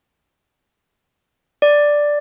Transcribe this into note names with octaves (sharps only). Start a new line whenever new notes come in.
D5